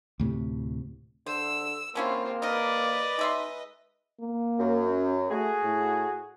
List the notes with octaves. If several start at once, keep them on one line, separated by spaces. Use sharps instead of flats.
D2 A2 C3
D3 C5 E6
D3 A#3 C4 C#4 E4 F4
D#4 A#4 B4 D5 D#5
G#3 D#4 E5 C6
A#3
F#2
C#4
A3 F#4 G#4
A2